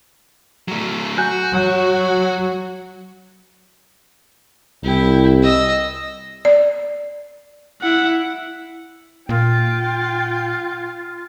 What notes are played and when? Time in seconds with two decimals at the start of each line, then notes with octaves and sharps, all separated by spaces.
0.68 F#3 A3
1.18 F#4 G#5 F#6 G6
1.52 F#3
4.84 C2 E4 G5
5.43 D#5 E6
6.45 D5
7.82 E4 F#5
9.29 A#2 F4 G5